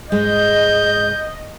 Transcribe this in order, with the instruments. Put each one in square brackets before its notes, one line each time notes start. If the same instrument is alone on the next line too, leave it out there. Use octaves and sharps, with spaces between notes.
[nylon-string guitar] G#2 G#3 [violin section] D#5 [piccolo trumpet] G6